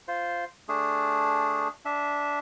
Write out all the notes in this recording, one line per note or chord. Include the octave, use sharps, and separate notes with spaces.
F4 C5
A3 D4 G#4
D4 E5